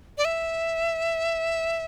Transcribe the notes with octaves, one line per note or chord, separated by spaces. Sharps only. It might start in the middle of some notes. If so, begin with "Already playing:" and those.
D5
E5